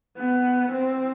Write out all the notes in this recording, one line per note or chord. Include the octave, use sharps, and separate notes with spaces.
B3
C4